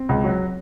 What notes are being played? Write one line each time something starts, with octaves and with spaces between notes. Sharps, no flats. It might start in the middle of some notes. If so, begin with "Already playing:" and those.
Already playing: C4
C#2
F#3